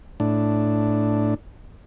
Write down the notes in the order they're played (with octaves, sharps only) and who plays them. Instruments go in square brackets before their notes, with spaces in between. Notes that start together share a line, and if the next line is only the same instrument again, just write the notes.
[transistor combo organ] A2 D4